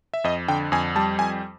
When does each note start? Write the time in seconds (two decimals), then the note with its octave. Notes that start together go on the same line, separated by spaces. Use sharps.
0.14 E5
0.24 F2 D#5
0.48 D3 G5
0.72 F2 G#5
0.96 G3 A5
1.19 F2 G#5